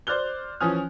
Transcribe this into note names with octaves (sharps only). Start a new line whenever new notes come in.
C5 D5 F6 F#6 G7
E3 F3 C#4 G#5 D#6 F6